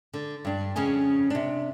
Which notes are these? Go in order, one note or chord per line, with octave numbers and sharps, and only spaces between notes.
D3
G2 D4
F2 C#3 C#4 D#5 G#5
C3 D4